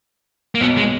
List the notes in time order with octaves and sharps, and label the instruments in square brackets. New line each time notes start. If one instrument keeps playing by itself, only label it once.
[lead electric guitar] A#3
[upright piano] B1 B2 [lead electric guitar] B3
[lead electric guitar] G#3